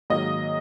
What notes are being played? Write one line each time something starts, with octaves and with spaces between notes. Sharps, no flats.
G#2 D#3 F#3 A#3 D#5